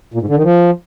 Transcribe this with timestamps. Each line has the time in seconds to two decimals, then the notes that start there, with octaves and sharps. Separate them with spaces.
0.14 A#2
0.21 G#2
0.29 D3
0.36 D#3
0.43 F3